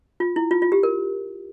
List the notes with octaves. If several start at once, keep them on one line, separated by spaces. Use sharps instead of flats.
F4
E4
F4
F4
G4
A#4